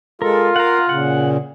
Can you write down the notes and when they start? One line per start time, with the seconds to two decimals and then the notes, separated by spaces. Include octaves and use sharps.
0.22 G#3 F4 A4 A#4
0.56 A#4 F5 F#5 A#5
0.89 A#2 C#3 F#5